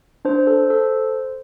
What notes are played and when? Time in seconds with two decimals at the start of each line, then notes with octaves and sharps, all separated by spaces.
0.25 D4 C5
0.47 A4
0.70 A4